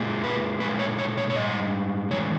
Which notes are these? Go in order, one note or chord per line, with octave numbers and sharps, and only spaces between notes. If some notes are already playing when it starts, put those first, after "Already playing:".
Already playing: A#2 G#3
B4
A#2 G#3 B4
C#5
C#5
C#5
C#5
G#2 G3 D#5
E2 D#3 G#3 C#5